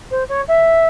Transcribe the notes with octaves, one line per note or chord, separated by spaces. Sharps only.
C5
C#5
E5